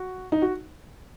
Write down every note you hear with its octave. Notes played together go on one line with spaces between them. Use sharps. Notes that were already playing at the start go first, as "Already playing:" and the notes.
Already playing: F#4
D#4
F#4